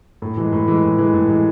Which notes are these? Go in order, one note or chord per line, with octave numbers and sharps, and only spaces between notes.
A2
E3 G#3
A2
E3 G#3
A2
E3 G#3
A2
E3 G#3